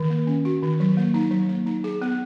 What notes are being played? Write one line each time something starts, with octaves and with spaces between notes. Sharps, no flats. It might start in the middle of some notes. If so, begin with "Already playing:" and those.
Already playing: D#3
A#3
C#4
F#4
D#3
F#3
A#3
D#4
F#3
A#3
D#4
G#4
B3